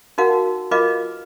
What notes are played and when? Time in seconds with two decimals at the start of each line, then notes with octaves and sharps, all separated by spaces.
0.18 D#4 F#4 A#4 F5 F#5
0.71 F4 A#4 B4 D#5 F5 D6